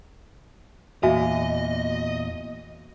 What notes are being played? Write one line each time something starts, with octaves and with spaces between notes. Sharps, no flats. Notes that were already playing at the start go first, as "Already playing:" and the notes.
E2 A#2 F#4 D#5 E5 G#5